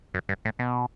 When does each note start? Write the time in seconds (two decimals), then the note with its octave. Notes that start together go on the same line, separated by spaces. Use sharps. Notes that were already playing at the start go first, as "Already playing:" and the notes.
0.14 F#2
0.29 G2
0.45 A2
0.59 B2